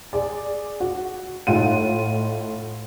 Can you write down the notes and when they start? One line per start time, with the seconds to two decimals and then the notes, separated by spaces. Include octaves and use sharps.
0.13 G#4 D5
0.80 F#4
1.47 A2 D#4 F4 F#5 D#7